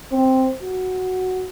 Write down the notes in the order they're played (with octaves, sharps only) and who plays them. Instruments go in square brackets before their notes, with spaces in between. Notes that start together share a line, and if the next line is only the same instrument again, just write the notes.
[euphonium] C4
F#4